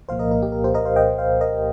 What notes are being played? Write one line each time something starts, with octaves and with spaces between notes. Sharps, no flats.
C2 A#2 F3 A#3 C5 F5
A#4 D#5
A#4
G4
A#4
G4 C5
A#4 D#5
C5 F5
D#5 G5
C5 F5
A#4 D#5